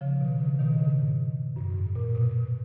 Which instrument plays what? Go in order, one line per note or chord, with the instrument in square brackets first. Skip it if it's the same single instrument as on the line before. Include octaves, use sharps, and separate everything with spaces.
[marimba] C#3 F3
B2 D#3
C#3
B2 D#3
C#3
G#2
F#2
G#2
A#2
B2